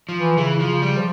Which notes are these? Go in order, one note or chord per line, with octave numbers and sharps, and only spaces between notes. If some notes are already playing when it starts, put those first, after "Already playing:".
F3
E3
C#3 E3
F3
C#3
G3
F3